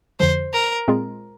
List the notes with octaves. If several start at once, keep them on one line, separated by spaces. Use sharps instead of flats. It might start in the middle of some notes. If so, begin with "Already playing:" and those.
F2 D3 F3 C5
A#4
A#2 G#3 C4 F4 G#4